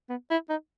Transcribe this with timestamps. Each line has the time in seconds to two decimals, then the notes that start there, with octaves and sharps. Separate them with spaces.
0.10 B3
0.31 E4
0.50 D#4